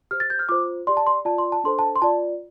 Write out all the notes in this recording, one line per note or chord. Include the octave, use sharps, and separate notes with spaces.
G4 C5 F6
A6
G6
F6
F4 C5 D6
G4 D5 C6
A5
C6
F4 D5 A5
C6
A5
D4 A4 C5 C6
A5
C6
F4 D5 A5